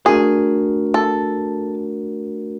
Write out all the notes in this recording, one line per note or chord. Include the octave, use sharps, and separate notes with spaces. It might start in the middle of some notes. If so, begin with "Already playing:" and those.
A3 D4 F#4 G#4 A#4
A4